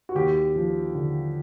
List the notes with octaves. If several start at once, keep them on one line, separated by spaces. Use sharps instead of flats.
F#4
D#2 G4
F3
D3